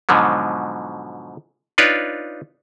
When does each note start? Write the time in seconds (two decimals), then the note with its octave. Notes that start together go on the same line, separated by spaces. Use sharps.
0.09 G#2 B2 D3 F3 F#3
1.78 D4 D#4 F4 B4 C#5 D5